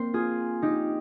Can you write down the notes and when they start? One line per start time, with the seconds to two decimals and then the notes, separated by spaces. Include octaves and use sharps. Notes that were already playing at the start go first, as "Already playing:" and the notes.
Already playing: A#3 C4 C5
0.14 F4 G#4
0.62 D#4 G4